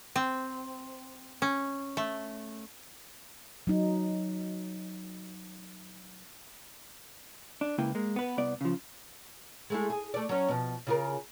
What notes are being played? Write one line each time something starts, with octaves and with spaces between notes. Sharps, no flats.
C4
C#4
A3
F#3 D#4
D4
C#2 C#3 A#3 E4 B4 G5
G#3 A#3
B3 B4
C2 B3 D5
C#3 F3
G#3 A3 E4
G#4
A3 D5
F#3 C#4
B2 F3
C#3 F4 A#4